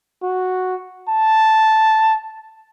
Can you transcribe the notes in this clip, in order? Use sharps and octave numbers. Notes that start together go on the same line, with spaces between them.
F#4
A5